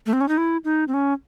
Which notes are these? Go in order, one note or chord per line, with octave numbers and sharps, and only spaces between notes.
A3
C4
C#4
D#4
E4
D#4
C4
C#4